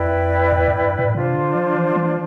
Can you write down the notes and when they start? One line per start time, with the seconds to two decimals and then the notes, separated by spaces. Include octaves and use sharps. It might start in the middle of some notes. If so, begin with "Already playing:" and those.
Already playing: F2 E4 B4 D5 G5
0.52 E2
0.68 F2
0.83 G2
0.99 A2
1.14 C3 D4 F4 C5
1.35 D3
1.55 F3
1.76 E3
1.96 E3